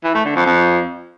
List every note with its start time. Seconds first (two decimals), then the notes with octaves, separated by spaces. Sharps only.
0.04 E3
0.14 A3
0.25 D3
0.35 F2
0.46 F2